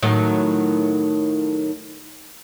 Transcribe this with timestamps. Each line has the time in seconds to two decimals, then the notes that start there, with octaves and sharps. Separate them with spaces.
0.03 A2 D#3 F#3